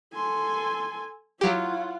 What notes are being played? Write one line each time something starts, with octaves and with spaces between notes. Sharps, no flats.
A4 G#5 C6
F#3 E4 F4 G4 C#5 F#5